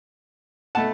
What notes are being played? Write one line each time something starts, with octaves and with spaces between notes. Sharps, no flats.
B2 A3 F#5 A5